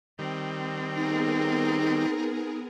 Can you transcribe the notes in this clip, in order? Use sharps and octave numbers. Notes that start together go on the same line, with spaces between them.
D#3 G3 C4
B3 D#4 G#4 A#4